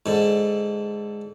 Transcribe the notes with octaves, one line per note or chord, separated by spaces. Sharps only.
G#2 D3